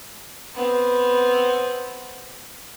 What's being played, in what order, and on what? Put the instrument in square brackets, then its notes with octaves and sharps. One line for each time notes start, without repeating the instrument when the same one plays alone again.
[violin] B3 C4